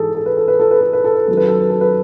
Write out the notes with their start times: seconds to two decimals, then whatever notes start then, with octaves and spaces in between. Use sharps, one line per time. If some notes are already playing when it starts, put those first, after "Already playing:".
Already playing: G#2 E3 G#4 A4
0.15 A4
0.26 B4
0.37 A4
0.48 B4
0.60 A4
0.71 B4
0.81 A4
0.93 B4
1.04 A4
1.14 B4
1.27 F#2 D#3 F#3 A4
1.37 B4
1.48 A4
1.59 B4
1.70 A4
1.81 B4